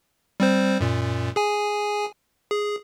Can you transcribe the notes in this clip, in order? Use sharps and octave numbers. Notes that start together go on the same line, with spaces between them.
G3 C4 C5
F#2 A#2
G#4 G#5
G#4